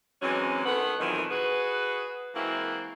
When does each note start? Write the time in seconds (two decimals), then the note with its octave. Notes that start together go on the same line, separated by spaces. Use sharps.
0.22 D3 E3 F#3 G#3 C4 C#4
0.66 D#3 A3 B3 F#5
1.00 F2 B2 D#3 E3 F#3
1.30 F#4 G#4 B4
2.35 E3 G#3 A#3 C4 E4 F#4